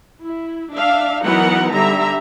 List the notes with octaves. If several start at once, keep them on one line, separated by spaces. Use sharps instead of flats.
E4
D4 E5 F5
E3 F#3 B3 D#4 A#4 F#5
D3 G3 E5 A#5